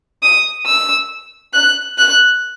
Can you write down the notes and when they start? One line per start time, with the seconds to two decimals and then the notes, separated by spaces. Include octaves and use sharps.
0.23 D#6
0.66 E6
1.54 F#6
1.98 F#6